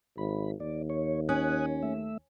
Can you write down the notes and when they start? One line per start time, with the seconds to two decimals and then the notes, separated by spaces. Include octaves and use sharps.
0.18 G#1 B5
0.60 D#2 D5
0.90 C#5
1.29 C#4 G#5 D#6 F#6
1.83 A3 E5